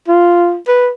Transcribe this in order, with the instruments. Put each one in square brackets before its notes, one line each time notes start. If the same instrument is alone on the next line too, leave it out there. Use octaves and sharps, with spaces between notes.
[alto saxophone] F4
B4